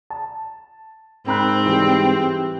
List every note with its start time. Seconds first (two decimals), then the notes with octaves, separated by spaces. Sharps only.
0.10 A5
1.27 G#2 C4 A#4 B5 F#6
1.65 E3 G3